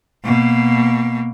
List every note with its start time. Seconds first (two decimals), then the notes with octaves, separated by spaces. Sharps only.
0.24 B2 A#3